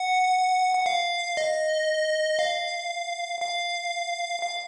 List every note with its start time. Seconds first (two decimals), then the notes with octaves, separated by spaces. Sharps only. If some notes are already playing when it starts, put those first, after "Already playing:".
Already playing: F#5
0.75 F#5
0.86 F5
1.37 D#5
2.39 F5
3.41 F5
4.42 F5